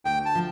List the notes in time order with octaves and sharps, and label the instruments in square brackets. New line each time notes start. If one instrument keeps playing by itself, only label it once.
[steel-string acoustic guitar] D2 [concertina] G5
[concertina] A5
[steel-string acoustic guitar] F3